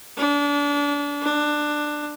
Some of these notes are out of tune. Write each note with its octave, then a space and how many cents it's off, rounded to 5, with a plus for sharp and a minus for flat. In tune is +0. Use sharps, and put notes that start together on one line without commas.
D4 -30
D4 +15